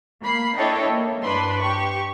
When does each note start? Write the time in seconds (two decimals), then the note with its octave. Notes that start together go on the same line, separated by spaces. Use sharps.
0.22 A#3 B5 C7
0.58 D4 E4 A4 C#5 D#5 G5
0.88 A#3
1.23 G2 D4 B4 B5 C6
1.60 G4 C#6